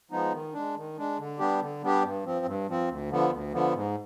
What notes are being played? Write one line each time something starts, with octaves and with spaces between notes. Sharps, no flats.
F3 G#3 B3 D#4
D#3
G#3 D4
D#3
G#3 D4
D3
G3 B3 D4 G4
D3
G3 B3 D4 G4
G2
F3 C4
G2
F3 C4
D2
D3 F3 B3
D2
D3 F3 B3
G#2